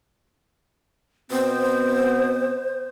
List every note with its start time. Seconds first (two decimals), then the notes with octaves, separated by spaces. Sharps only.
1.31 B2 B3 C4 C5